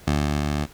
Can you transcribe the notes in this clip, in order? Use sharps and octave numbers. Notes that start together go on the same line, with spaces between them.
D2